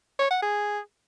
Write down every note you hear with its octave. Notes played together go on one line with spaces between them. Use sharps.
C#5
F#5
G#4